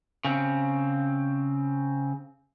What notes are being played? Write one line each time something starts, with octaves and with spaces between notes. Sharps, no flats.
C#3 C4